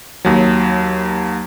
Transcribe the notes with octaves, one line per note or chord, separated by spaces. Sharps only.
D#2 F#3